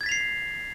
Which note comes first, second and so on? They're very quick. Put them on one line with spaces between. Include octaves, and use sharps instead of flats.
G#6 A6 B6 F7 C7